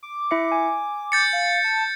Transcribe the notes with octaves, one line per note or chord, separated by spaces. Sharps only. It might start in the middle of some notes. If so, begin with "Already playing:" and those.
D6
E4 E5 C#7
G#5
G6 A6 C#7
F5
A5